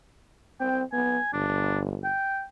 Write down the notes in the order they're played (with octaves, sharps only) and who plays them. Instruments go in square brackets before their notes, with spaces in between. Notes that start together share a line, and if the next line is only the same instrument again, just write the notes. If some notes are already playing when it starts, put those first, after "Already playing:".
[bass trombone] C4 [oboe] G5
[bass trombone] B3 [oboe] G#5
[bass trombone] G1 [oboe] D4
[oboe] G5